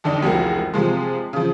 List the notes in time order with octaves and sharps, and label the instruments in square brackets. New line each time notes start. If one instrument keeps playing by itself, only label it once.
[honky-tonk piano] F2 D3 D4 D#4
F1 C#2 E3 F3 F#4 A#4
C3 F3 G#3
C#3 F3